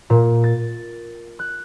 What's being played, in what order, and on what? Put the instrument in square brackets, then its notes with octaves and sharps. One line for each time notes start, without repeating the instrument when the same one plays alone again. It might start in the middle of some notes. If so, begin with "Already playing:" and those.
[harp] A#2
A6
F#6